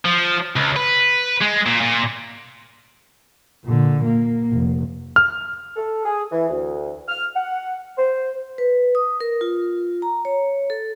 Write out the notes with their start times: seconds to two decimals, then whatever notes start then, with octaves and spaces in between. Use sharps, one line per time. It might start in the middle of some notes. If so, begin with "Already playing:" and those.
0.05 F3
0.56 C#2
0.76 B4
1.42 G#3
1.66 A#2
1.81 A#2
3.64 A#2 D3
4.04 A#3
4.51 F1
5.16 F6
5.76 A4
6.05 G#4
6.31 E3
6.49 D2
7.08 F6
7.36 F#5
7.98 C5
8.58 B4
8.95 D#6
9.20 A#4
9.41 F4
10.02 A#5
10.25 C#5
10.70 A4